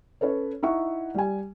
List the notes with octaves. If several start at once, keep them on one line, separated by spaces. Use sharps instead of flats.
C#4 A4 B4 C#5
D#4 E4 E5 F#5 C#6
G3 G#5